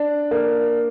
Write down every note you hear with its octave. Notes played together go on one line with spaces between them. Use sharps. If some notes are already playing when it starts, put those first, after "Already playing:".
Already playing: D4
A#3